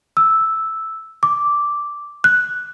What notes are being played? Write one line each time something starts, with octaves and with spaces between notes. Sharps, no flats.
E6
D6
F#6